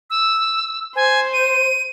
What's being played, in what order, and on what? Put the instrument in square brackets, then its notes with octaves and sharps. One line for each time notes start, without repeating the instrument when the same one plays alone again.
[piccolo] E6
[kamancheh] C5 [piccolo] G#5
[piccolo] D#7